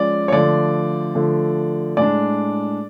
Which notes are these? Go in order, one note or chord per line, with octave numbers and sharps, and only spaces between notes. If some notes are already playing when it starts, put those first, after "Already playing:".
Already playing: F3 G#3 C#4 D5
C#5
D3 F3 A3 D5
D3 F3 A3
A2 G#3 D4 D5